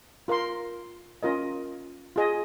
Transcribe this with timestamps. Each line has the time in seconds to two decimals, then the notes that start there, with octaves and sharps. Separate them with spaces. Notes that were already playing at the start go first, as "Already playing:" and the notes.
0.28 F4 A#4 F5 C6
1.23 C#4 F4 A#4 D#5
2.16 F4 G#4 D#5